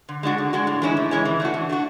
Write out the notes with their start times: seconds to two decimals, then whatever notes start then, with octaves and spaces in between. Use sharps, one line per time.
0.09 D3
0.23 G#3 D4 F#4
0.38 D3
0.53 G#3 D4 F#4
0.67 A2
0.82 E3 G#3 C#4 E4
0.97 A2
1.11 E3 G#3 C#4 E4
1.25 E3
1.40 A3 D4 F#4
1.54 E3
1.69 A3 D4 F#4